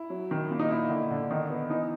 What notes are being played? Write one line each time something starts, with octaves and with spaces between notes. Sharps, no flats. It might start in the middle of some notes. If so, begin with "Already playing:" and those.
Already playing: E4
F#3
D#3
A#2
D#4
A#2 E4
D3
D3
D#3 D#4
B3
E3 D#4